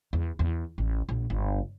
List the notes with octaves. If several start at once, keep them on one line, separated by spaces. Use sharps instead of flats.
E2
E2
A1
A#1
G1